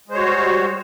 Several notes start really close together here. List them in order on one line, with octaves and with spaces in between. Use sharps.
G#3 C5 C#5 F#4 G3